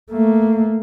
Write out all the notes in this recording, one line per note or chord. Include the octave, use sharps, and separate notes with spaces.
A3 A#3